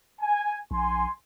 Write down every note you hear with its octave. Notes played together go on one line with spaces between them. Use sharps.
G#5
A#1 G#5 C6